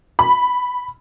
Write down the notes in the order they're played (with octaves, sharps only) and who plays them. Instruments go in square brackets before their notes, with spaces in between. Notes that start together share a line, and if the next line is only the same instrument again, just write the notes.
[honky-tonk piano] B5